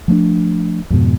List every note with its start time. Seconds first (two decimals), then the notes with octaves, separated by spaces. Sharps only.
0.08 F3 A3 B3 D4
0.90 F2 G#2 B2